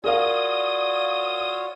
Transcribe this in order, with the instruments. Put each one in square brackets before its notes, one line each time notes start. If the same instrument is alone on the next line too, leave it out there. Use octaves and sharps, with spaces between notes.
[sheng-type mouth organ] F4 F#4 C#5 [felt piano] G#4 A#4 F5 [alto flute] D5 [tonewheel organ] D#6